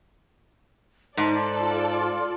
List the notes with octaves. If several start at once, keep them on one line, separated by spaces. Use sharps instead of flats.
G#2 A4 D5 A5
F4